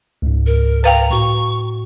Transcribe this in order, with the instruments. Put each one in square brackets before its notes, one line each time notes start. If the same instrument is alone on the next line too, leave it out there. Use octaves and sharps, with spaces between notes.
[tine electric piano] C#2 G#2
[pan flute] A#4
[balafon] B4 F5 G5 [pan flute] A#5
[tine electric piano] A2 F#4 [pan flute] C#6